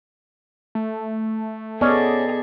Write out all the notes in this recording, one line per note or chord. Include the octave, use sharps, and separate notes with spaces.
A3
B3 C#4 G#4 A4 D5 D#5